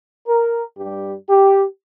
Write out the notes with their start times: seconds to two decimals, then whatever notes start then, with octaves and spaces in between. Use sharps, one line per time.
0.28 A#4
0.78 G2 G3 G4
1.29 G4